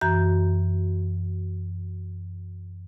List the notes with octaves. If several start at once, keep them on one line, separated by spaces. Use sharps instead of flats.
F#2 E3 F#4 A#5 G6